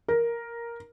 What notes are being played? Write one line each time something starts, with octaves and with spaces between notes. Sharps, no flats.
A#4